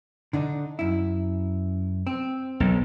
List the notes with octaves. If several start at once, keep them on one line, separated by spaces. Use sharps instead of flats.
D3 D4 D#4
F#2 E4
C4
B1